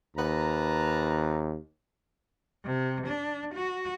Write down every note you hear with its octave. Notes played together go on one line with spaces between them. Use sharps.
D#2 B4 A5 A#5
C3
D4
F#4